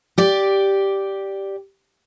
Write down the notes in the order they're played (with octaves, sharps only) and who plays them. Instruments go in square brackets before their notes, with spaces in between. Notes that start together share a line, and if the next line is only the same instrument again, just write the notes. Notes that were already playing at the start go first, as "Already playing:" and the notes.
[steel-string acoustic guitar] G4 D5